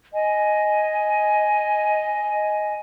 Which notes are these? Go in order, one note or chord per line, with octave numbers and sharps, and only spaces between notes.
D#5 G#5